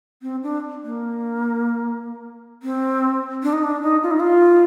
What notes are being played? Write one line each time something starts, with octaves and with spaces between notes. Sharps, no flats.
C4
D4
A#3
C4
D4
D#4
D4
D#4
F4
D#4
F4